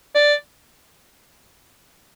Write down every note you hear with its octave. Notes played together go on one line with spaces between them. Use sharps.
D5